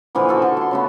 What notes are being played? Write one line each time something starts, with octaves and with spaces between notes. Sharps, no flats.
A#2 D3 E3 F3
F#4 A4 G#5 C#6
D3
A5 C6
C#3 A3 B3